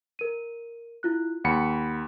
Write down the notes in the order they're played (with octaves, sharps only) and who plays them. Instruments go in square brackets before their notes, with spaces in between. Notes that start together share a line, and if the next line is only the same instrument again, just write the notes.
[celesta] A#4 D#7
E4 F4 F#6
[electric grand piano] D#2 B5 C#7 [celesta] F#5